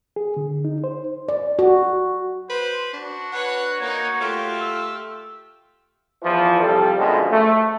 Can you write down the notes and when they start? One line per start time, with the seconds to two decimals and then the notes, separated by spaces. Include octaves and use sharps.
0.16 G#4
0.37 D3
0.65 D#4
0.84 C5
1.29 D5
1.59 F#4
2.50 B4 C5
2.93 D4 F#4
3.32 B4 C#5 F#5
3.80 A#3 D#4 C#5
4.21 A3 F4 G4
4.61 E6
6.23 E2 E3 F3
6.61 C3 F3 G3 A4
6.99 F#2 B2 D3 F3 G#3
7.30 A3